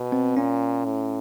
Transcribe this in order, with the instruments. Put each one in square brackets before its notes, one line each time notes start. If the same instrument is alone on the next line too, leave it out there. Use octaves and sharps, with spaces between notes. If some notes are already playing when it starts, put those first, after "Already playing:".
Already playing: [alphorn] B2
[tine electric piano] C4
[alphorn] A#2 [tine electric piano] C#4
[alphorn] A2